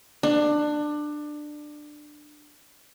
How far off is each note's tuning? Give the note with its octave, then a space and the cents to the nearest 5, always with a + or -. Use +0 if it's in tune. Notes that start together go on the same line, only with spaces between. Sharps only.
D4 +20